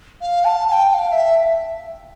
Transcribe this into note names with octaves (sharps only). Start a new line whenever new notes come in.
F5
A5
A5
G5
G5
F5
E5